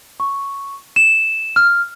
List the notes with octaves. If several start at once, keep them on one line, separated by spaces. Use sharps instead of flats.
C#6
E7
F6